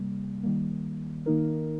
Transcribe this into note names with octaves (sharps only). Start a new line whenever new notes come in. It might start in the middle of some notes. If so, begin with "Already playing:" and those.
Already playing: C3 G3 A#3
D#3 G3 A#3
D#3 A#3 D#4 A#4